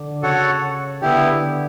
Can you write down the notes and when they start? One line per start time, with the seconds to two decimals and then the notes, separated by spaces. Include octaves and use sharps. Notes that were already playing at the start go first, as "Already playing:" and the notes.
Already playing: D3
0.23 C#3 F#4 A4 C#5 F#5
1.01 D3 B3 E4 G4